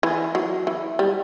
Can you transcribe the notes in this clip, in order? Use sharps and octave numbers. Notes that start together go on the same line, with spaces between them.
E3
F#3
E3
G3